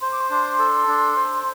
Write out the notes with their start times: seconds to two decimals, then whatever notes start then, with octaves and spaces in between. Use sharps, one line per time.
0.01 C5 C6
0.12 D6
0.21 C6
0.30 D4
0.59 A4
0.88 D4
1.17 C5